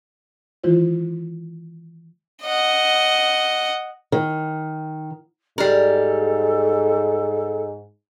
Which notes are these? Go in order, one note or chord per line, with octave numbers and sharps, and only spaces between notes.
D#3 E3 G#3 E4 F4 C5
D#5 F#5
D#3
G#2 G3 A4 A#4